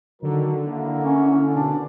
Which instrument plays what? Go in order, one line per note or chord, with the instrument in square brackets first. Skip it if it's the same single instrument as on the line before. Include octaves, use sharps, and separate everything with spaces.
[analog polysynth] D3 [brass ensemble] D#3 F#3 A#4
[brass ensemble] A#3 E4 F#5
[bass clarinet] C#4
[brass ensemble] B2 [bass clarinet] D4